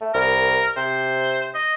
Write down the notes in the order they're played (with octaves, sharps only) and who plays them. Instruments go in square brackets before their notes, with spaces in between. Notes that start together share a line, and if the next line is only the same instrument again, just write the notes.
[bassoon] A3
[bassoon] C2 [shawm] A#4
[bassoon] C3 [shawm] C5
[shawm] D#5